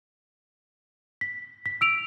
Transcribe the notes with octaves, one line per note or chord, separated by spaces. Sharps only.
B6
B6
E6 D7 F7